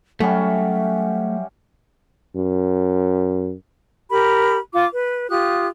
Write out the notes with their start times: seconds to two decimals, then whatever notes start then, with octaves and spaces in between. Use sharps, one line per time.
0.20 F#3 G3 A3 C#4 F#4 E5
2.37 F#2
4.10 G4 A#4 B5
4.73 F4 D6
4.92 B4
5.30 F4 G4 D#6 F#6